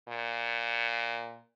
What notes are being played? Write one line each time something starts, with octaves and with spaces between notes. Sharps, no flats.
A#2